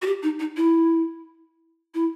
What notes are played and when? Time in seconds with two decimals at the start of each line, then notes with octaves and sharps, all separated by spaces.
0.02 F#4
0.06 G4
0.23 D#4
0.40 D#4
0.57 E4
1.94 E4